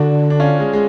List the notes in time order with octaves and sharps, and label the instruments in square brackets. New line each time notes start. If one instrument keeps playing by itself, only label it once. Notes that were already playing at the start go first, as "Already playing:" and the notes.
Already playing: [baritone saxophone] D3 [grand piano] D4 F#4
[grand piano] D4
C#4 F4
G#3
G#3